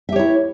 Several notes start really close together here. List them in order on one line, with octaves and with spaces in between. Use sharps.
E5 G4 C#5 E4